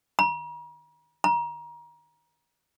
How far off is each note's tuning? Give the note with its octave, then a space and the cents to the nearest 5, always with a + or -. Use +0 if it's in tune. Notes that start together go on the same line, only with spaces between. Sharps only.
A#5 +45
A#5 +25